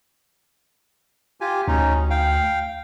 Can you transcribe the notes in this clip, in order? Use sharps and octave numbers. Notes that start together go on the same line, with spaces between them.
F4 G4 G#5
D2 C#4 D#4
F5 G5